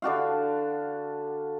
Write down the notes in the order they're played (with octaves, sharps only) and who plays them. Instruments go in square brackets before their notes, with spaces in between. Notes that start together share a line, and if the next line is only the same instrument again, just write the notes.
[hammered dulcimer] D3 D4 F#4 F5